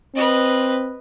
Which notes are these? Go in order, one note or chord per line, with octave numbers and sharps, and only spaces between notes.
C4 B4 D#5